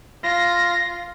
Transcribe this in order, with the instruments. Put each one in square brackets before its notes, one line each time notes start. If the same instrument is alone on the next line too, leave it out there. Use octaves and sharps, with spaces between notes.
[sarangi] F4 [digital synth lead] A#6